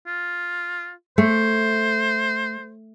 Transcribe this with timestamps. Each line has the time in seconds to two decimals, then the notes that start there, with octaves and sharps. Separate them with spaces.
0.07 F4
1.18 A3 C5